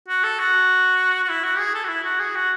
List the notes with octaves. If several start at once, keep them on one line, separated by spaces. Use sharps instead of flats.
F#4
A4
F#4
F#4
E4
F#4
G#4
A4
F#4
E4
F#4
G#4
F#4